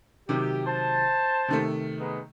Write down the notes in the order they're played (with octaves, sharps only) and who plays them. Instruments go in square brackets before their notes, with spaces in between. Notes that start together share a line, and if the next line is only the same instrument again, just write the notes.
[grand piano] C3 D#3 F#3 [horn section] G4
[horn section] C5 A5
[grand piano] C3 D#3 A3
[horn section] G#3 B3 D#4